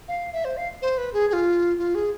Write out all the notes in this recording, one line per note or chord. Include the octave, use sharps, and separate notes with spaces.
F5
E5
C5
F5
C5
B4
G#4
G#4
F4
F4
G#4